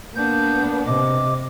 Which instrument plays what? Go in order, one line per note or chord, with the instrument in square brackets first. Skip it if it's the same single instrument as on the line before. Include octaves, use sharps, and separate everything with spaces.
[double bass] A#3 [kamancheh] B3 D4 [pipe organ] G6
[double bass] C3 [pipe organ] D#5 D6